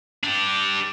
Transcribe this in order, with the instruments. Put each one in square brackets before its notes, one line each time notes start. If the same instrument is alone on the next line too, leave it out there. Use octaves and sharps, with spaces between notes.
[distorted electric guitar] D4 G4